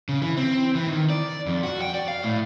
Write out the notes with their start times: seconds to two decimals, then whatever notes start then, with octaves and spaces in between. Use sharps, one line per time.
0.09 C#3
0.22 E3
0.37 C4
0.75 E3
0.88 D#3
1.10 D5
1.47 F2
1.63 F#4
1.82 G5
1.95 D5
2.08 F5
2.24 A2